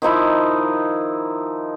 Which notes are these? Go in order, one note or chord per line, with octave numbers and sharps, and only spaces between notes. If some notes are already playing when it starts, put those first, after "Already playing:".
D#3 F3 D#4 E4